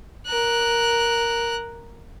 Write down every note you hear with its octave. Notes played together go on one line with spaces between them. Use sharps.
A#4 F#6